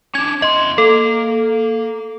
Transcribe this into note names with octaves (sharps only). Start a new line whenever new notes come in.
C#4 D4 G#6
E2 D#5 C6
A#3 A4